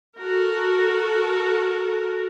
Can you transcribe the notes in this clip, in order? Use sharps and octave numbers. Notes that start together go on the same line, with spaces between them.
F#4 A4 A#4